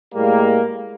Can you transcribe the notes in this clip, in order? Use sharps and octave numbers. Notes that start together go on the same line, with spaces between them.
A2 G3 G#3 A#3